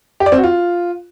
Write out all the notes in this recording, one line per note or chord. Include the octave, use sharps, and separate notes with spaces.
G4
D5
C4
F#4
F4